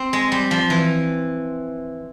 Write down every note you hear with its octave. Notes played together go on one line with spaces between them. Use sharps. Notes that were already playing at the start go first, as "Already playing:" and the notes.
Already playing: C4
G#3
G3
F3
E3